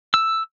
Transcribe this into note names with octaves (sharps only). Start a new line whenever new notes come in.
E6